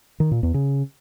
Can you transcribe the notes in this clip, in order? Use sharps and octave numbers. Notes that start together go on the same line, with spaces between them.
D#3
A#2
E2
C#3